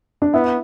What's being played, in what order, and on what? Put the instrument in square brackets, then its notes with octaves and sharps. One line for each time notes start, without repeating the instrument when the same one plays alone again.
[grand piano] D4
[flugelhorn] B3 [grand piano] E4